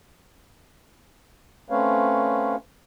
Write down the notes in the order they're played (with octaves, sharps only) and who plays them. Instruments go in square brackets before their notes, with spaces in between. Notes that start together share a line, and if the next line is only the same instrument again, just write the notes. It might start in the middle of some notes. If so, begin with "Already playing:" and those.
[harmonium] A3 C4 C#4 B4 C#5 F5